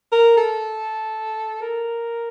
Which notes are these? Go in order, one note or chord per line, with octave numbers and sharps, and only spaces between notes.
A#4
A4
A#4